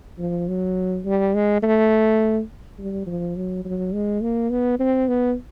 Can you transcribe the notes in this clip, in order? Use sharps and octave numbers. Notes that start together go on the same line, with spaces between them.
F3
F#3
G3
G#3
A3
G3
F3
F#3
F#3
G#3
A#3
B3
C4
B3